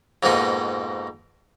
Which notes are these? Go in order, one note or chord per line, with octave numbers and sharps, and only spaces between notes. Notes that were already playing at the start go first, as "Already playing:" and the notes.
F2 G#2 B2 A#3 D#4